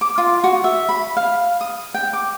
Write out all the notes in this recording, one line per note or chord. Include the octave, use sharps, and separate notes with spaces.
D6
F4
F#4
E5
B5
F5
D#6
G5
D6